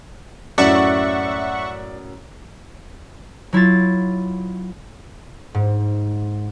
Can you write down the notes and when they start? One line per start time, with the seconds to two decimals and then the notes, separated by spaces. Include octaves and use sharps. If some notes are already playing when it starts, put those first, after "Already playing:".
0.58 F#2 A2 D5 E5 F#5 C#6
3.53 F#3 E4 F4 A6
5.55 G#2